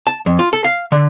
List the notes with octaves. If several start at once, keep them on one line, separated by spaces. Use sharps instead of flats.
A5
F2
F4
A4
F5
D3